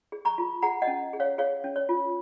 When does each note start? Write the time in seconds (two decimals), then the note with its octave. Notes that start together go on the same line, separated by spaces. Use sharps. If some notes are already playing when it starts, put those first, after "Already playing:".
0.12 G#4
0.25 A#5 C#6
0.38 F4
0.62 G#4 F#5 A#5
0.82 D#5 F#5
0.87 C#4
1.13 G#4
1.20 C#5 F5
1.38 G#4 C#5 F5
1.64 C#4
1.76 C#5
1.89 F4